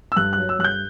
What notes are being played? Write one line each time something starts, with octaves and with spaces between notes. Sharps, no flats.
E6
G2 F#6
F#3 F#6
E6
G2 F#6
G6